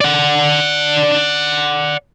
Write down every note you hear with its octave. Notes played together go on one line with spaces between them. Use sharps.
D5 F#5